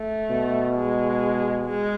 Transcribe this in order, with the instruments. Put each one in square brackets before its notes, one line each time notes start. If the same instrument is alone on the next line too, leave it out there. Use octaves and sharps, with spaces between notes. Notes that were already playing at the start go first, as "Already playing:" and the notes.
Already playing: [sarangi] A3
[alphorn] B2
[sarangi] G#3
G#3